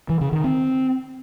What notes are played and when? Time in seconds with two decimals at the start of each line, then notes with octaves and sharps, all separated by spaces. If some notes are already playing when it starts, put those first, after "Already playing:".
0.09 E3
0.21 C#3
0.33 D#3
0.44 C4